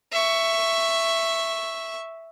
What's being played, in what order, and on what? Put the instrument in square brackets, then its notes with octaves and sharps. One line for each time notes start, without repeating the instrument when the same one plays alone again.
[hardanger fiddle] E5 C#6